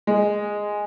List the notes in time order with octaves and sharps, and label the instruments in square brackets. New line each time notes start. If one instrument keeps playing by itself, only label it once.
[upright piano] G#3